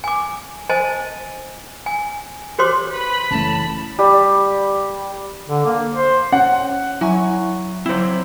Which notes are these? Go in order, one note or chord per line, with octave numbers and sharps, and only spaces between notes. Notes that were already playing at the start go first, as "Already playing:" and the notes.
G#5 D6
C5 D#5 G#5 A5
G#5
F#4 G4 C5 C#5 C6 D6
B4 B5
F#1 C#3 E3 A3 C#4 A5
G3
D3
A#3
C5
C#4 F#5
F#3 E4 G#5 C#6
F#3 C4 E4 C5